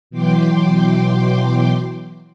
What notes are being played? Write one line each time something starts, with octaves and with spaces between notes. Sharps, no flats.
B2 E3 F#3 G5 C6 D6